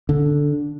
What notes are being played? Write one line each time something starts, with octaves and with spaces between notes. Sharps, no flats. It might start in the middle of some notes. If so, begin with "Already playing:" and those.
D3